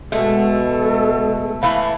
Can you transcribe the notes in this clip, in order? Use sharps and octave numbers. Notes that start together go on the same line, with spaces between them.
B2 G#3 A3 A4
E3 A3 F5 B5